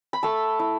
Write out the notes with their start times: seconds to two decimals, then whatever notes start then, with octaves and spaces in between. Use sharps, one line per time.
0.13 B5
0.23 A3 A5
0.59 E4